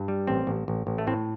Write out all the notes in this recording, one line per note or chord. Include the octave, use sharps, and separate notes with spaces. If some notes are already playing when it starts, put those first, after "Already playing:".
Already playing: G2
G3
A1 C4
A1
A1
A1
A3
A2 C4